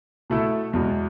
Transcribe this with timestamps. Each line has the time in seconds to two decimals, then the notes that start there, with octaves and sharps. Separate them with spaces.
0.30 B2 A3 E4 A4
0.73 E2 B2 G#3